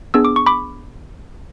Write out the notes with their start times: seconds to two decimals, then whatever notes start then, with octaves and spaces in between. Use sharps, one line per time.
0.14 B3 D4 G#4 E6
0.25 D6
0.36 C#6
0.46 B5 D6